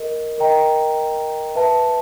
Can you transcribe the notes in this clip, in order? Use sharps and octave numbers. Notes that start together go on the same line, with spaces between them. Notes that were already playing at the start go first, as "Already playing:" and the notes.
Already playing: A#4 D#5
A#4 D#5 G5 A#5
B4 E5 A5